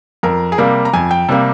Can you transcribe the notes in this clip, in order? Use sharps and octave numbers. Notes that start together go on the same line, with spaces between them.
F2 A#4
G#4
C3 G3 A#3 A#4
A#5
F2 G#5
G5
C3 G3 A#3